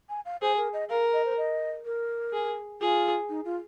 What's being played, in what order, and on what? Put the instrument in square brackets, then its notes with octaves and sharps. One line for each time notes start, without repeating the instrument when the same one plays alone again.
[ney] G#5
F5
[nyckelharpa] G#4 [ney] C5
[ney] A#4
D#5
[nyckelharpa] A#4 [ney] F5
[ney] D#5
C5
D#5
A#4
[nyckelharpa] G#4
[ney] F4 [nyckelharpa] G#4
[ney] D#4
F4